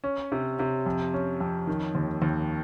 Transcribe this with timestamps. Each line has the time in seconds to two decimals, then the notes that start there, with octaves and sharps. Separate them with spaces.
0.04 C#4
0.32 C3
0.59 C3
0.86 F2
1.14 C#4
1.40 F2
1.67 D#3
1.95 D#2
2.22 D#2